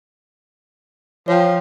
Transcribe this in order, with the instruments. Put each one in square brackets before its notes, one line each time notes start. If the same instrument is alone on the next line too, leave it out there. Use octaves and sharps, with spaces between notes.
[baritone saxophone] F3 [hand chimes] C#5 G5